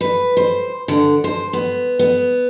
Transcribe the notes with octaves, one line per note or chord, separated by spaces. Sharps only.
B4
C5
D3
C5
B3
B3